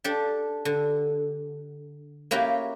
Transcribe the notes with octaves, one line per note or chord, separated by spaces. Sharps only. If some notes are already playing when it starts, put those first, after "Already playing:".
D4 G4 A4
D3
A#3 C#4 E4 F#4 G4